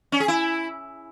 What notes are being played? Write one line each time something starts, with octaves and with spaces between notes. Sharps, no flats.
C#4
G#4
E4